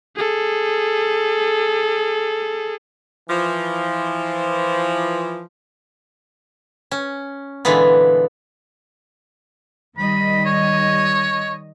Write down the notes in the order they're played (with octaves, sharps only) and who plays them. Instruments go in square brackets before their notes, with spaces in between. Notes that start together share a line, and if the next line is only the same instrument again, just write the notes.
[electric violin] G#4 A4
[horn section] E3 F3
[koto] C#4
A#2 D3 E3 G#3 B3
[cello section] D#3 G3 D#5 [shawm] B5
[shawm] C#5